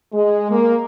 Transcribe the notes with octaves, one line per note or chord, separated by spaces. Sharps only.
G#3
A#3